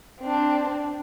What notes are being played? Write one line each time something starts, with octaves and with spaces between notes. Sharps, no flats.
C4 D4